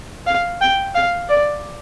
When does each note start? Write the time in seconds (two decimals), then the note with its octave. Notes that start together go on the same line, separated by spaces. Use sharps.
0.27 F5
0.61 G5
0.95 F5
1.29 D5